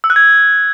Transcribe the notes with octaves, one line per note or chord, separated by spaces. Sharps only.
E6
F#6
G#6